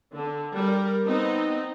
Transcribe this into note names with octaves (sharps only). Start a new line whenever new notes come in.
D3
G3 A#4
B3 C4 D#4